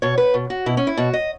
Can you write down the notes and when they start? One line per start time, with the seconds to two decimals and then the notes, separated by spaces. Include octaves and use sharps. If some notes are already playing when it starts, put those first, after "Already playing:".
0.02 B2 C#5
0.18 B4
0.34 B2
0.50 F#4
0.66 B2 E4
0.77 C#4
0.87 E4
0.97 B2 F#4
1.14 D#5